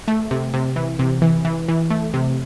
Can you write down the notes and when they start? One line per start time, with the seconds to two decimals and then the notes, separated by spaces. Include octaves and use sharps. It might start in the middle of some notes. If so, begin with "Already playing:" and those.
0.08 A3
0.31 C3
0.54 C3
0.76 E3
0.99 C3
1.22 E3
1.45 E3
1.68 E3
1.90 A3
2.14 C3